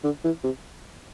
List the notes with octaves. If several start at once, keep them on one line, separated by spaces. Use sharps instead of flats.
D3
E3
C3